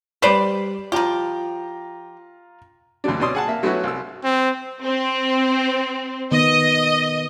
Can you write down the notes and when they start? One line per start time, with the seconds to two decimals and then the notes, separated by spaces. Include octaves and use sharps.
0.22 G3 B4 C5 D5 E7
0.92 F3 F4 G4 A#5
3.04 D2 B2 F#3 D4
3.20 B2 C#4 D5 C6 D#6
3.35 G#4 F#5 A5
3.48 A#3 E5
3.63 F#3 A3 B3 C#4 E4 F#4
3.83 C2 E6
4.24 C4
4.82 C4
6.32 D#3 B3 D#5